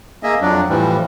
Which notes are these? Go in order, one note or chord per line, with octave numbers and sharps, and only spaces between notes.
A#3 G#4 D#5 E5
F2 F#3 D4
A2 E3 F3 G3